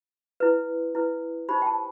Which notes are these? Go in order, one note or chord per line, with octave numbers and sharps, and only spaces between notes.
E4 B4
E4 B4
D#4 G4 C5 B5
G5
A5